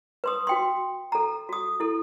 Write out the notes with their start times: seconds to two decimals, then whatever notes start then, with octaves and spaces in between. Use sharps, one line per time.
0.24 B4 C6 D#6
0.47 F#4 G5 C6
1.12 A4 A#5
1.49 F#4 D#6
1.80 E4 A4